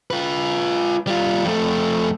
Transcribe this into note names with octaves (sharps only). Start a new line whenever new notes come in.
F4 B4
G3 F4
F2 A3